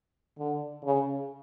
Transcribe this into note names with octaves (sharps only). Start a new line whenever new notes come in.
D3
C#3